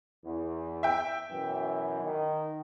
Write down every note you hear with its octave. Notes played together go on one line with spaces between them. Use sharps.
E2
E5 G5
F#2 B2 E3
D#3